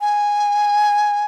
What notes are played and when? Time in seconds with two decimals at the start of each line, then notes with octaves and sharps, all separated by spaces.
0.01 G#5